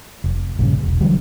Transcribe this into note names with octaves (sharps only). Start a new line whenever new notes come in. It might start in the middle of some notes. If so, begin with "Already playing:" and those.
F1
A#1 G2 C#3
E1
D3 E3 F#3 G3